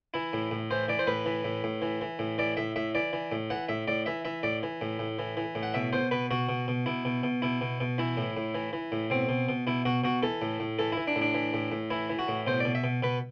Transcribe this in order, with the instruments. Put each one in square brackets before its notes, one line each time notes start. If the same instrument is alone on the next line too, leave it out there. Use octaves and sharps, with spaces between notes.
[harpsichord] E3 E4
A2
A2
E3 C5
E3 D5
C5
A2 B4
E3
A2
A2
E3
E3
A2
E3 D5
A2 E5
A2 E5
E3 D5
E3
A2
E3 F#5
A2 E5
A2 D5
E3 E5
E3 E5
A2 D5
E3
A2
A2
E3
E3
A2
F#5
B2 E5
B2 C5
B2 B4
B2 F#4
B2
B2
B2 E4
B2
B2
B2 E4
B2
B2
E3 E4
A2
A2
E3
E3
A2
B2 C4
B2
B2
B2 E4
B2 F#4
B2 F#4
E3 A4
A2
A2
E3 A4
E4
E3
D4
A2
D4
E3
A2
A2
E3 E4
E3
F#4
A2
B2 C5
D5
B2
E5
B2
B2 B4